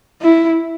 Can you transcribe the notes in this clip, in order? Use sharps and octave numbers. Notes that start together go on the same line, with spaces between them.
E4